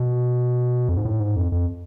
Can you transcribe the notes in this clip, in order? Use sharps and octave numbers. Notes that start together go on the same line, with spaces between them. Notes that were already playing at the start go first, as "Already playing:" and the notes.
Already playing: B2
F2
G#2
A2
G#2
F2
F2